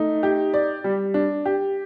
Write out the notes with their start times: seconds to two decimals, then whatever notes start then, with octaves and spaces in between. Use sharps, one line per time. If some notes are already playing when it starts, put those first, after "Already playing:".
Already playing: A3 D#4
0.23 G4
0.54 D5
0.84 G3
1.14 D4
1.46 G4